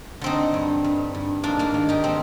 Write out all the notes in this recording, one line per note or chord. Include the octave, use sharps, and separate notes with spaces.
D3 C4 D#4
G2
G2
G2
G#2 A#3 D4
A#3 D4
D#3
D#4 G4
D#3 C4 D#4